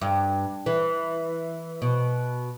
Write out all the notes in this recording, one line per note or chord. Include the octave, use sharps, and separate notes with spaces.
G2
E3
B2